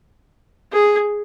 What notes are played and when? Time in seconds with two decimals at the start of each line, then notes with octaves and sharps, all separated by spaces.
0.72 G#4